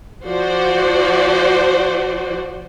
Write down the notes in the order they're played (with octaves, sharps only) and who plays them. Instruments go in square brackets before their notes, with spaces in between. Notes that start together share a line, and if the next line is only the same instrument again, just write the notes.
[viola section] F3 F#4 C5 D5